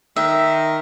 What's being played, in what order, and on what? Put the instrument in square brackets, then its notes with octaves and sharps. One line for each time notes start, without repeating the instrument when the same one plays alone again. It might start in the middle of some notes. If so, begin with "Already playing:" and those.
[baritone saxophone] D#3 [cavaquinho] E5